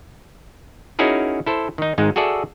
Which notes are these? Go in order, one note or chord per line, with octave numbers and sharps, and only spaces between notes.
C#4 D#4 E4 F#4 G#4 A#4
E4 A4 C5
D#3 D#4
G#1 G#2 G#3 D#4
F#4 G#4 A4 D5 E5